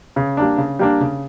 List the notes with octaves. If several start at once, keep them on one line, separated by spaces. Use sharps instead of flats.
C#3
G3 A#3 D4
C#3
G3 A#3 D4
C#3